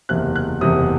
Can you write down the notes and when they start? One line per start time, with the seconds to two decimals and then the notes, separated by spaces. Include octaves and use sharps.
0.09 F#1 E2 C3 F#6
0.36 F#6
0.61 F#1 E2 C3 D#6